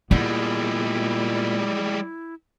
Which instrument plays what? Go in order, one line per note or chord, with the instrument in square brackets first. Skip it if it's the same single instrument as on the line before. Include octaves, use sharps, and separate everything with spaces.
[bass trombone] A#2 [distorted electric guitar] G3 G#3 [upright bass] B3 [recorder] E4